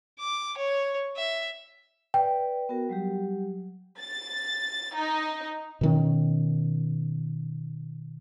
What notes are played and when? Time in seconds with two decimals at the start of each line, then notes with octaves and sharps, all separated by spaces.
0.19 D6
0.57 C#5
1.17 E5
2.14 B4 D5 G5
2.69 B3 F#4 A#4
2.89 F#3 G3 G4
3.99 A6
4.95 D#4
5.81 B2 D#3 C#4